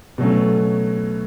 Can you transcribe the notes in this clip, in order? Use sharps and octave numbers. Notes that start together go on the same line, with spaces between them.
B2 F#3 A3 C#4